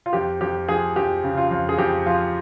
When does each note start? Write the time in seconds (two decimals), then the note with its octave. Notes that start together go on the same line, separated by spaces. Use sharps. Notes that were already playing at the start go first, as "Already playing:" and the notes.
0.06 F4
0.13 F2 G4
0.41 F2 G4
0.69 F3 G#4
0.96 F2 G4
1.24 C#3
1.38 F4
1.51 F2
1.69 G#4
1.78 F2 G4
2.06 F3 F4